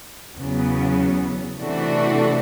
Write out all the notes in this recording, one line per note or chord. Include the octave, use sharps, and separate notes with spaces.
E2 C#3 F#3 B3
C3 E3 A3 D4 F#4